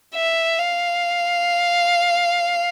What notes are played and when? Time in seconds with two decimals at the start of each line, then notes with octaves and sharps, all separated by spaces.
0.15 E5
0.59 F5